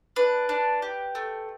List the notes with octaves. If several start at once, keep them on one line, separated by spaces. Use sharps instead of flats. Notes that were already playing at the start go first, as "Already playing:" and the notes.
D4 B4
D4
G4
A3